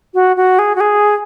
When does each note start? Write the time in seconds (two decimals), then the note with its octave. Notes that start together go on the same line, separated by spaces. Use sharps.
0.14 F#4
0.37 F#4
0.59 G#4
0.75 F#4
0.80 G#4